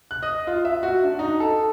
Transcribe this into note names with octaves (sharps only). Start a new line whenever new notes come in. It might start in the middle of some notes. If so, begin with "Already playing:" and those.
F#6
D#5
F4
E5
F#4
D4
D#4
A4